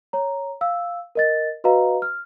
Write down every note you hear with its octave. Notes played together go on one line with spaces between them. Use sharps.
C#5 A#5
F5 E6
A#4 D#5 A6
F#4 B4 D#5 F5 A#5
F6